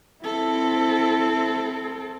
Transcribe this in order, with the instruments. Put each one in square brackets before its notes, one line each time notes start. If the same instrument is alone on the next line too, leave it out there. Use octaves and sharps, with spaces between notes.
[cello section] C4 [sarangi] E4 [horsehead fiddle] A4